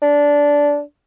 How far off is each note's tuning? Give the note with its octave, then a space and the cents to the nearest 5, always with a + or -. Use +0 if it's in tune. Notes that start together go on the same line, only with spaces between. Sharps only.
D4 -15